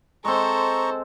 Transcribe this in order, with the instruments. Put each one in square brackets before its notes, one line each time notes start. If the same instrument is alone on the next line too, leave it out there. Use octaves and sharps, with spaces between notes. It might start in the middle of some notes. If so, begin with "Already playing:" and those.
[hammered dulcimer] G#3 C4 [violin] A4 C5 [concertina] A#5 C#6